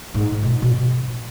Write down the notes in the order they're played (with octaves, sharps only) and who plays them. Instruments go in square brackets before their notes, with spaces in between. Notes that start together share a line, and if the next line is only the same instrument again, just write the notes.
[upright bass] G#2
B2
B2